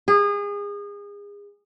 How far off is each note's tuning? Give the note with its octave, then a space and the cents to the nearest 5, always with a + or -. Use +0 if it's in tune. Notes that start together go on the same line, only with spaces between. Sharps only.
G#4 -30